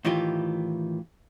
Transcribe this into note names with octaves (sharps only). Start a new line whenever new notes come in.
A2 D#3 E3 F4 G4